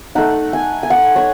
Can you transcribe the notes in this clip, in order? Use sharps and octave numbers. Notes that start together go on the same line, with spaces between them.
A3 D#4 F#5
G#5
G#5
F#5
C#5